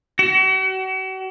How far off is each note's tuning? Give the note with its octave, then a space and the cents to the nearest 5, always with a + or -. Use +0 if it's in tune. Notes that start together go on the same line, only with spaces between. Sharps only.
F#4 +40